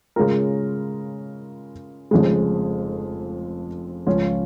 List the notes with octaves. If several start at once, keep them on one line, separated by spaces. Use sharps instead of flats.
C#3 G#3 C#4 F4 A#4
F1 F2 C#3 G#3
C#2 C#3 F3 C#4 F4